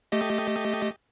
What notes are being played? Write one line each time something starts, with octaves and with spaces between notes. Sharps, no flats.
A3 G4 D#5